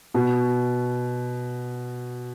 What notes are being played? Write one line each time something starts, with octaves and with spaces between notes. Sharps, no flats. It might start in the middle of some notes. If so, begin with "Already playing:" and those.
B2